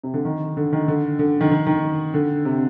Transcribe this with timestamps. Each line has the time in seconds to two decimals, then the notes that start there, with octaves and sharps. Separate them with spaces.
0.03 C3
0.14 D3
0.25 D#3
0.57 D3
0.73 D#3
0.88 D3
1.19 D3
1.41 D#3
1.51 D#3
1.66 D#3
2.14 D3
2.45 C3